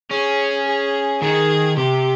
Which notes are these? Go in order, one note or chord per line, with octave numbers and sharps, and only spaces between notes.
C#4 G#4
G#4
D#3 G#4
C3 G4